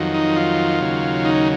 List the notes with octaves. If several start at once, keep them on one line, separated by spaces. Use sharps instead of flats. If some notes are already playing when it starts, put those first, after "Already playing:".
Already playing: F2 D#3 F#3
D#4
F4
D#2 C#3 F#3
D#4